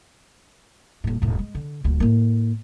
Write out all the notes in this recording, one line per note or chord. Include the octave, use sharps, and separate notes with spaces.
D#1 A2
E1 A2
G#3
D3
D#1 D2
A2 A#3